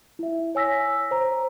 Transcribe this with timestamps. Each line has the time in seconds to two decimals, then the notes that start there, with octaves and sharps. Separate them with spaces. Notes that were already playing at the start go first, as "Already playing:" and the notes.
0.19 E4 E5
0.55 C#5 G#5 E6 A#6 B6
1.11 C5 A#5